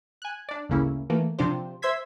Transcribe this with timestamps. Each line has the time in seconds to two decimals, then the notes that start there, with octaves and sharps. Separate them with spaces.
0.22 G#5 F#6
0.49 D4 D5
0.69 G#1 D2 C#3 A#3 C#4 E4
1.10 D#3 E3 A3 A#3
1.39 C3 F3 D4 F4 G4 C5
1.82 C5 E5 C6 E6 G#6 B6